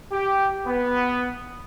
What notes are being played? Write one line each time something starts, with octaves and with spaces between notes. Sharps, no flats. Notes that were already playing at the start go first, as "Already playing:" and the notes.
G4
B3